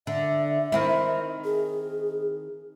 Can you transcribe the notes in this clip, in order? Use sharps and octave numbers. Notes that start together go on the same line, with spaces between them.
D3 E5
D#3 C4 E4
G#4